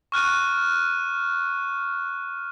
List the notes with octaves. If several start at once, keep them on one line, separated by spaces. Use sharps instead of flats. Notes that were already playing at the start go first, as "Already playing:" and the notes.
C#6 F6 F#6 D#7